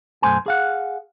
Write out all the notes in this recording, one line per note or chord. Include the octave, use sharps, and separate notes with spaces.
B1 F#2 A3 C5 G#5
G#4 F5 F#5